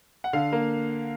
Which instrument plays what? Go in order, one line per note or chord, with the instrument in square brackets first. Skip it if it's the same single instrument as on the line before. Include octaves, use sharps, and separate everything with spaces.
[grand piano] F#5
D3 F5
A#3